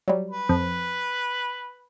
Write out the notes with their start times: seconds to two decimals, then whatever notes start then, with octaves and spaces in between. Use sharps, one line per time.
0.08 F#3 G3
0.30 B4
0.49 F2